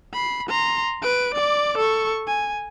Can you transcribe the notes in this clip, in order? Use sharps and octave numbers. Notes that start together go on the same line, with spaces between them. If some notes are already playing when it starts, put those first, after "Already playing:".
B5 C7
A#5 C6
B4 D7
D5 D6
A4 C#6
G#5